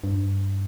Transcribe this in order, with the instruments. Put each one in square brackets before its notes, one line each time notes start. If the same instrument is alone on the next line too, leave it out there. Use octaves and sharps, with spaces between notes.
[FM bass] G2